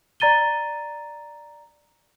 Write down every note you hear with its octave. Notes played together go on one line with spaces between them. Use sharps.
D5 A#5 A6 D#7 G7